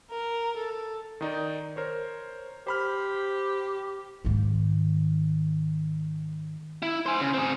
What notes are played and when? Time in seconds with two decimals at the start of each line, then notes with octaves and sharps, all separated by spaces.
0.11 A#4
0.57 A4
1.21 D#3 D#4 D5
1.76 A#4 C5 C#5
2.67 G4 C5 B5 F6
4.25 G#2 D#3
6.82 E4
7.06 C5 G#5
7.21 C#3
7.34 C4 G#4